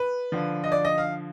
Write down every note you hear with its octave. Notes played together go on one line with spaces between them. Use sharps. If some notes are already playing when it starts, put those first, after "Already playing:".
Already playing: B4
D3 F3
D#5
D5
D#5
F5